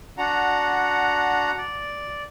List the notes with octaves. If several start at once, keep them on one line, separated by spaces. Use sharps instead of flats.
D4 F#4 F#5 A#5
D5